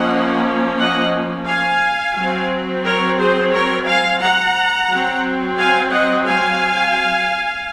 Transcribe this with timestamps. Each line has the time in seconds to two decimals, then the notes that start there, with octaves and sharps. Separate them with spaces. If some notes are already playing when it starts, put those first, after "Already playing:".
Already playing: F3 A#3 C#4 D#5 F#5
0.79 D#5 F#5
1.47 F5 G#5
2.16 F#3 C4
2.84 A#4 C#5
3.19 G#4 C5
3.52 A#4 C#5
3.87 F5 G#5
4.21 F#5 A#5
4.89 F#3 C4
5.57 F5 G#5
5.91 D#5 F#5
6.26 F5 G#5